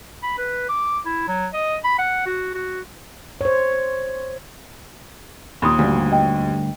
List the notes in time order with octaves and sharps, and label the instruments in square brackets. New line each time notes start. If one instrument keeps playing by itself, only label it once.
[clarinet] B5
B4
D6
E4
F#3
D#5
B5
F#5
F#4
F#4
[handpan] C5 C#5
[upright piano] D#2 A#2 [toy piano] B5 C6 D#6
[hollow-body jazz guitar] D2 G2
[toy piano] D#5 G5